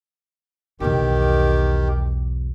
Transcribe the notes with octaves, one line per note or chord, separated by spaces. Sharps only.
B1 E2 D#3 G4